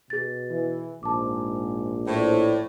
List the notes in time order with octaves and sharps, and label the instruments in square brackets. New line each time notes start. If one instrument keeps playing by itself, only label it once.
[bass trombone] B2 [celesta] G#4 A6
[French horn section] E3
[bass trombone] A#1 [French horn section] G#2 [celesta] A5 D6
[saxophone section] A2 [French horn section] C5 D5